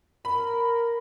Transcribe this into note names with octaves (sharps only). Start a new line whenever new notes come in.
A#4 B5